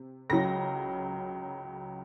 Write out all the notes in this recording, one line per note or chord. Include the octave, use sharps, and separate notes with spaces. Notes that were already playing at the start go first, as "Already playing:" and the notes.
Already playing: C3
C#2 C#3 F#3 A#6